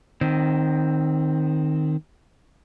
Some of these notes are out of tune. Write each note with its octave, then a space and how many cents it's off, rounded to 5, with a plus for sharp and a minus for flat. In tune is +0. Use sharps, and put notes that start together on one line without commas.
D#3 -10 C4 +10